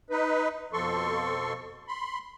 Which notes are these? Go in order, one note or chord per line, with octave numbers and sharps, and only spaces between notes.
D#4 B4
F2 B2 F3 A4 C6 C#6
B5 C6